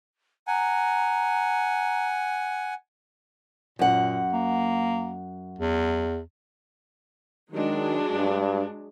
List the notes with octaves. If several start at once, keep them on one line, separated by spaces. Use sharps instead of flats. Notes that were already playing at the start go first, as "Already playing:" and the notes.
F#5 G#5 A#5
F#2 A#2 F#5
A#3
E2
D#3 F#3 G#3 D4
G2